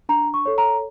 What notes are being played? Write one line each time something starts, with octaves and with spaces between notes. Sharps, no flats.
D4 A#5
C#6
A4 C#5
A#5